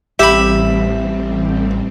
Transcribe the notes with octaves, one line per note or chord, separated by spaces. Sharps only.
A1 G3 C4 G4 E5 B5